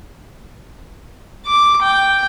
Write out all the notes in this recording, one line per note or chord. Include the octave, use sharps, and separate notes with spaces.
D6
G5